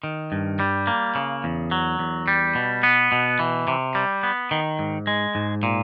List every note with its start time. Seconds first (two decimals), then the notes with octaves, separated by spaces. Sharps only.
0.04 D#3
0.32 G2
0.60 G3
0.87 A#3
1.15 C#3
1.44 E2
1.71 F#3
1.99 E2
2.28 G3
2.55 B2
2.83 B3
3.12 B2
3.39 E3
3.68 C3
3.95 G3
4.23 B3
4.51 D#3
4.79 G#2
5.07 G#3
5.35 G#2
5.63 A#2